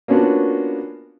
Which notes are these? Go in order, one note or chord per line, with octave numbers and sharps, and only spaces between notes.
A#3 B3 C#4 D4 F4 F#4